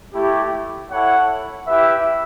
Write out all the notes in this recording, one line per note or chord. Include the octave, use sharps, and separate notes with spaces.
A3 E4 G4
E4 A4 C#5 F#5
E4 G4 B4 E5